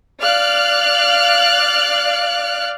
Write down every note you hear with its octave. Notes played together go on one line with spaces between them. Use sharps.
D5 F5 F6 F#6